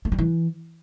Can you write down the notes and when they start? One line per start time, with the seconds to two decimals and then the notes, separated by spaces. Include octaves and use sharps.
0.05 A3
0.12 G3
0.19 E3